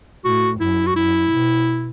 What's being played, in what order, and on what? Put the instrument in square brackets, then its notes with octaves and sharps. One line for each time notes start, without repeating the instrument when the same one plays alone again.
[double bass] A2 [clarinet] F#4
[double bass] F#2 [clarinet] E4
[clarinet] F#4
[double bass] F#2 [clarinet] E4
[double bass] B2